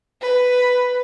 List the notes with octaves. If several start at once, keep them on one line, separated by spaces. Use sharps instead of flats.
B4